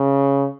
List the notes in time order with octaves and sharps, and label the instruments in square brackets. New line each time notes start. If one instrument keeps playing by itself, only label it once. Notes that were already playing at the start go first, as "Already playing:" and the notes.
Already playing: [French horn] C#3